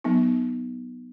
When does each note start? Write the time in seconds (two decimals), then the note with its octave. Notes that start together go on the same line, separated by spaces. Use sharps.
0.04 F#3 B3 D#4